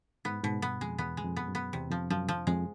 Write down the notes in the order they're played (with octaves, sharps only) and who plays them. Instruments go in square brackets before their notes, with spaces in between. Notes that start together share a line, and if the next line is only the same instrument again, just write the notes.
[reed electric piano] G#2 [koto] B3
[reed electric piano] G#2 [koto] B2
[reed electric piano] G2 [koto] B3
[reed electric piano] F2 [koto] G#3
[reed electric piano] E2 [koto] B3
[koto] G#3
[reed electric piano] F2
[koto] B3
[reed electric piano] F#2
[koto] B3
[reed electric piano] E2 [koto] C3
[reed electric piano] F2 [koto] F3
[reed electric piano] F#2 [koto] F3
[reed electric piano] F2 [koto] F3
[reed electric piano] F2 [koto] G#3